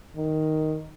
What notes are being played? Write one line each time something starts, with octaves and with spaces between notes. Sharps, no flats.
D#3